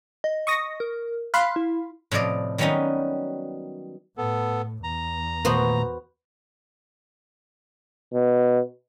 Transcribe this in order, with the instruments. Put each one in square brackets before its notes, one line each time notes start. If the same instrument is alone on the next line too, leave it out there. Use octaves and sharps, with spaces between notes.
[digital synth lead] D#5
[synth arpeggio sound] C#6 D#6 A#6
[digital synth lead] A#4
[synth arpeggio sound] F5 B5 C6 [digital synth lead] F#6
[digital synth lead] E4
[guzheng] A2 C3 F3 D5 D#5
D#3 F#3 G3 B3 C#4 D#4
[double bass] A2 [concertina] B3 A4
[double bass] E2 [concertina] A#5
[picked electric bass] A#2 D#3 A3 [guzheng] B3 F#4 C5
[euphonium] B2